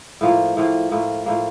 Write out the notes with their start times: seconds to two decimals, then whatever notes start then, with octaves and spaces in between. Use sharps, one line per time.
0.21 A2 F3 A#3
0.57 A2 F3 A#3
0.91 A2 F3 A#3
1.26 A2 F3 A#3